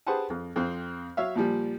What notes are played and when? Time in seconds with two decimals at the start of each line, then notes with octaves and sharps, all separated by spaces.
0.07 G4 G#4 B4 C5 F#5 A5
0.30 F2
0.56 F2 C4
1.17 F#3 C#5 E5 F5
1.36 A#2 F3 G3